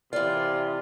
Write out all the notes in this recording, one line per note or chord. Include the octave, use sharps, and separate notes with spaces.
C3 E3 F4 D5